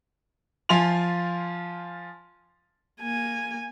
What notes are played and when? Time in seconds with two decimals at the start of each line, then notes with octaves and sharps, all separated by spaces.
0.69 F3 F4 G#5 C6 F7
3.01 A#3 G#5